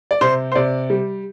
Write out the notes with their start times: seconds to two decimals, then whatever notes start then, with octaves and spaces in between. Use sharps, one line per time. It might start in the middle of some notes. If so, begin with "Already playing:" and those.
0.11 D5
0.21 C3 C5
0.52 C5
0.55 C3 D5
0.90 G3